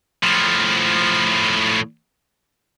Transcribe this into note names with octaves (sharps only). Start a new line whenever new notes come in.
A2 F3